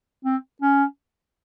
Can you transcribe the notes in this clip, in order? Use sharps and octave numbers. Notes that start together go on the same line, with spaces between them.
C4
C#4